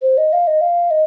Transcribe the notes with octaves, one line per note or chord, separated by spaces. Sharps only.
C5
D#5
F5
D#5
F5
D#5